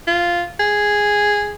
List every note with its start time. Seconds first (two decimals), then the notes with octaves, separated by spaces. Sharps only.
0.08 F4
0.60 G#4